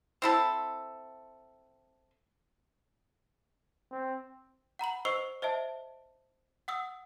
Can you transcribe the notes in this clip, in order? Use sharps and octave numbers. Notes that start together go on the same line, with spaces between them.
C4 E4 A4
C4
F#5 A#5 B5 F#7
C5 D#5 C#6 E6 C7 F7
C5 D#5 E5 A5
F#5 D#6 E6